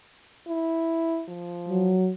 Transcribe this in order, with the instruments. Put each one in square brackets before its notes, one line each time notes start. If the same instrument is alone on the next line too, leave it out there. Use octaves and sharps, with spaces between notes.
[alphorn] E4
F3
[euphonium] F#3